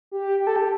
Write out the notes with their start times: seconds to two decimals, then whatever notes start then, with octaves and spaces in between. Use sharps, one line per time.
0.11 G4
0.40 G4
0.47 A4
0.56 G4